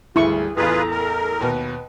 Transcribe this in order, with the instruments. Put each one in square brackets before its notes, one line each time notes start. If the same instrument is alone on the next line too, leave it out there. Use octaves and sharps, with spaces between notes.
[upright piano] G#1 D2 [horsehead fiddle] G3 G#4 [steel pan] E4 C#6
[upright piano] A1 E2 [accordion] F4 G#4 B4 [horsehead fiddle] A4 A#5
[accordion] A#4
[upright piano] D#2 B2 [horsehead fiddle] B4